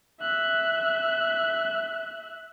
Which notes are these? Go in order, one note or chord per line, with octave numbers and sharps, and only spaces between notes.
E5 F#6